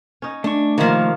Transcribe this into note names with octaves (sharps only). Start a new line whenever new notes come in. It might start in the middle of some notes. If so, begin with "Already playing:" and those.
C#4 D#4
A3 D4 C#6
C3 D#3 F3 A#3 C#5